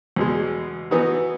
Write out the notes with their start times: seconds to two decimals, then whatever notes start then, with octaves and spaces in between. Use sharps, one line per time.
0.16 E2 B2 G#3
0.91 E3 B3 D#4 F#4